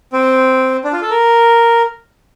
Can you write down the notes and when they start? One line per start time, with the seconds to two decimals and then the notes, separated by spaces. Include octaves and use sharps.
0.13 C4
0.84 D4
0.93 F4
1.02 A4
1.10 A#4